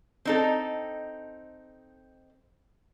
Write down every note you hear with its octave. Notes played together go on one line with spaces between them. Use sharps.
C4 D#4 A4